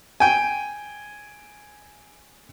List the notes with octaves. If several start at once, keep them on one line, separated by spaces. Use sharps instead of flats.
G5 G#5